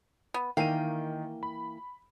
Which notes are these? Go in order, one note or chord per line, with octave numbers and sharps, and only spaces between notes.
B3
D#3 E3 A#3 F5 G5 D#7
B5